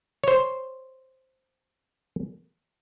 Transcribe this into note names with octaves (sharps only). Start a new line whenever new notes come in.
C5 C#5